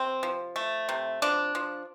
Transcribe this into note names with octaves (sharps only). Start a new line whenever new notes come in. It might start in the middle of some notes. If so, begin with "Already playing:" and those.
Already playing: C3 C4
F3
A3
C3
F3 D4
F3